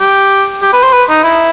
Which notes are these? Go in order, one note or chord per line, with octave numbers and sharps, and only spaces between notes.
G4
G4
B4
C5
B4
D#4
E4